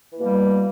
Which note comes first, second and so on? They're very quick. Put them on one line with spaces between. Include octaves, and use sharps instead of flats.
E3 A#3 B2 G3